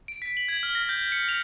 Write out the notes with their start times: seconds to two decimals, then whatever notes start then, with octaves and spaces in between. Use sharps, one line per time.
0.08 D7
0.22 B6
0.37 F#7
0.48 G#6
0.63 F6
0.75 A#6
0.89 G6
1.12 C#7
1.29 F7